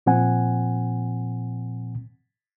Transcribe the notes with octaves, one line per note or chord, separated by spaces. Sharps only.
A#2 F3 C4 F#5 G#5